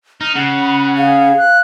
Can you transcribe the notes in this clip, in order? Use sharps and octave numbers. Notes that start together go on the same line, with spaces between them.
D#4 F6
C#3 F#5
B5
G#4 F5
F#6